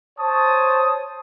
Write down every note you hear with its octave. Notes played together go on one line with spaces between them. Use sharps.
C5 C#5 A5 D#6